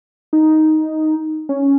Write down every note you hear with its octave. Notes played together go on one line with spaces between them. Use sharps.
D#4
C#4